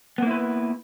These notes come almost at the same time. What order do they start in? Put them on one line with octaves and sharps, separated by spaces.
B3 A#3 E4 B4